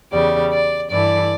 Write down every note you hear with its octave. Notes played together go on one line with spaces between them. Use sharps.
E2 C#3 G3 D5
D5
G2 E3 A3 D5